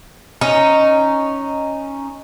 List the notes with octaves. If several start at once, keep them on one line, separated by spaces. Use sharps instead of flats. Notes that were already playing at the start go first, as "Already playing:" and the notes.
C#4 D#4